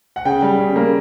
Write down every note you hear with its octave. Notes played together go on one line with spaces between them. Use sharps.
F#5
C#3 G5
G3
C#3
A#3